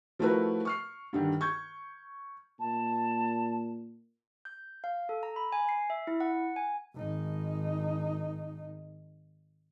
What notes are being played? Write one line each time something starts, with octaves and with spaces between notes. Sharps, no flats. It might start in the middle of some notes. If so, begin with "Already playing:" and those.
F3 A3 E4 F#4 A#4 B4
C#6 F6 C7
G2 D3 D#3
C#6 G6 G#6
A#2 A5
G6
F5
A4
A#5
B5
G#5
C7
E5
E4
F#5
G#5
G#1 D#4